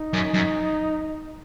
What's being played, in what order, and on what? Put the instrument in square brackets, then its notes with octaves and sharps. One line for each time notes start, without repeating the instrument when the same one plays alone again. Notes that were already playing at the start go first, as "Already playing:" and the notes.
Already playing: [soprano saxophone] D#4
[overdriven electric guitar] F#2
F#2